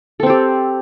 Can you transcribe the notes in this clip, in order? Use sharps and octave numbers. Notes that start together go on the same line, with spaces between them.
C4 G4 A4 C5